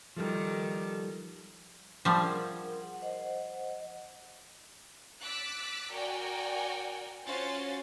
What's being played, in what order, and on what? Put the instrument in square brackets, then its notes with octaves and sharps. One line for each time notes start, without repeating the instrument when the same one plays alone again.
[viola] D#3 A4 [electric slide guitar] F3 G3
[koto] F3 G3 [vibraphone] D4
[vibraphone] G#4 A#4 F#5
F#5
C5 D#5 F#5
[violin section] D6 E6 F#6 A6 B6
F#4 A#4 D5 G5 G#5
C#4 F4 F#4 C5 A6